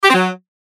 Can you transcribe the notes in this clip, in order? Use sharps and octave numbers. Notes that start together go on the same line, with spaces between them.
G4
C4
F#3